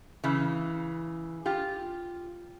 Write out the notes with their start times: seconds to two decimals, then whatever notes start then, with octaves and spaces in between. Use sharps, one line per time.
0.24 C#3 E3
1.45 F4 G4